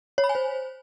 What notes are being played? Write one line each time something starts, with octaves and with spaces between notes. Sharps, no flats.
C#5
B5
G#5
C5